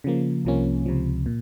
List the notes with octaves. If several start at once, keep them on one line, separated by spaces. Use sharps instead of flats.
C#3 F3 A#3
C2 C3 F3 A#3 C#4
C#2 C3 F3
A#2